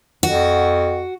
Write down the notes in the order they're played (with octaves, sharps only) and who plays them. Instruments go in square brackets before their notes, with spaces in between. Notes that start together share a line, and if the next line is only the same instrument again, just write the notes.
[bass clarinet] F2 [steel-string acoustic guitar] F#4